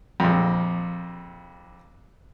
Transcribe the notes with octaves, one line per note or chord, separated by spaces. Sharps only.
A#1 F2